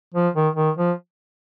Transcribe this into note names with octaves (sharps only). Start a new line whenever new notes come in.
F3
D#3
D#3
F3